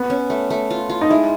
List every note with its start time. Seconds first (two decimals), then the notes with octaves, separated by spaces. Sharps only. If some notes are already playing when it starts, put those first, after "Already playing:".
Already playing: B3
0.10 C#4
0.30 A3
0.50 A3
0.70 F4
0.89 F4
1.01 D#4
1.10 G#3 E4